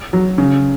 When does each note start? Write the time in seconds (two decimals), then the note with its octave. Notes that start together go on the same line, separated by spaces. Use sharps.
0.13 F#3
0.38 C#3